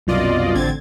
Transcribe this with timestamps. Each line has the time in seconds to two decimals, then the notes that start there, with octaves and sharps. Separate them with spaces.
0.07 C2 F#2 B2 F4 D5 D#5
0.55 A1 D3 C4 G#6 A6